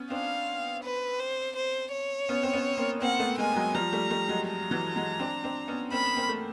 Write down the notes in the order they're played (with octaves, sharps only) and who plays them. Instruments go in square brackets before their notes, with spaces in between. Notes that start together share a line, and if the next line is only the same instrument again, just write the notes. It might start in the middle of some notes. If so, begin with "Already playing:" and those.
Already playing: [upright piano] B3 C#4
[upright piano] C4 D4 [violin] F5
[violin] B4
C5
C5
C#5
[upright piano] B3 C#4
C4
B3 C#4
A#3 C4
[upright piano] A#3 C4 [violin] F#5
[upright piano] A3 B3
[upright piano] G#3 A#3 [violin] G#5
[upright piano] F#3 G#3
[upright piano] F3 G3 [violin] A#5
[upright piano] G3 A3
G3 A3
F#3 G#3
[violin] A#5
[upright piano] E3 F#3
F#3 G#3
C4 D4
C4 D4
B3 C#4
[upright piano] A#3 C4 [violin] B5
[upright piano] A#3 C4
A3